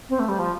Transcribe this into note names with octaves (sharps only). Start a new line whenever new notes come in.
C4
A3
G3
F3